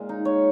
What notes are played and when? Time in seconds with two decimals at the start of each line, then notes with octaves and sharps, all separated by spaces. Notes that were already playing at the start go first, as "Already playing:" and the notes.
Already playing: A#2 G#3
0.09 D#4
0.25 C#5